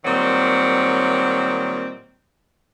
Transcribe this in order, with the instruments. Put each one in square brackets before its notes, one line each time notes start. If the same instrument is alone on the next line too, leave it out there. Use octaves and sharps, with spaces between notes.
[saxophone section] A#2 D#3 F#3 G3 C4